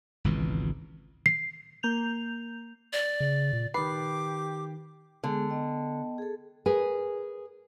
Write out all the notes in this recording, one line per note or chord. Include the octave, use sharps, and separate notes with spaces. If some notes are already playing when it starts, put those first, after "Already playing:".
G#1 C#2 B2 E3
C7
A#3 G6 F7
D5
C#3
A#2
D#3 G4 B4 D6 C7
D3 G#3 B3 G#4
B3 D#5 G5
G#4 A4
G#4 A#4 B4 G#5